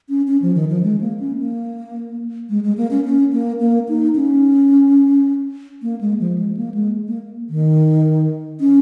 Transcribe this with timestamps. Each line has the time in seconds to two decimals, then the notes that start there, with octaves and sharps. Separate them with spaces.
0.09 C#4
0.28 C#4
0.42 F3
0.55 D#3
0.69 F3
0.83 G#3
1.01 A#3
1.20 C#4
1.39 A#3
2.50 G#3
2.64 G#3
2.77 A#3
2.91 C#4
3.05 C#4
3.33 A#3
3.60 A#3
3.89 D#4
4.16 C#4
5.83 A#3
6.01 G#3
6.20 F3
6.38 G#3
6.57 A#3
6.74 G#3
7.08 A#3
7.49 D#3
8.60 C#4